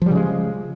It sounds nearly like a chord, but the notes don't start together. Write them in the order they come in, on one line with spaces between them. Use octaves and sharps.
F3 G3 C#3 G#3